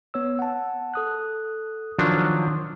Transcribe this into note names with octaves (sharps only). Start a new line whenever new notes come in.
B3 C#5 E6
F#5 A5
A4 D#6 F#6
D#3 F3 F#3 D4